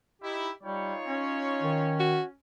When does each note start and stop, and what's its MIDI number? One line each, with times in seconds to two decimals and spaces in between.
0.21 0.48 63
0.21 0.48 64
0.21 0.50 67
0.63 0.94 55
0.63 2.10 63
0.63 2.10 65
0.63 2.10 73
1.07 2.35 61
1.62 2.18 51
2.00 2.24 66